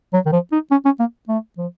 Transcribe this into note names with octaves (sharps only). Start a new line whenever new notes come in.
F#3
D#3
F3
D#4
C#4
C#4
A#3
A3
F3